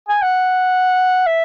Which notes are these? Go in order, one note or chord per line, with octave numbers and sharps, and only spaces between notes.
G#5
F#5
E5